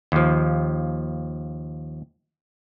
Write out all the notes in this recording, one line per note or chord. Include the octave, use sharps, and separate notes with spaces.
D#2 F3